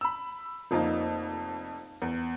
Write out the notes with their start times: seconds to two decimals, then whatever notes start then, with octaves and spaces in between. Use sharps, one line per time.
0.01 B5 E6
0.71 F1 F2 F3 A#3 D#4 A5
2.02 E2